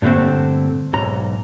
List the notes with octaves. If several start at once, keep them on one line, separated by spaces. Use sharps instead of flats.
G2 A#2 D3 A3 C4
B1 G#2 A#5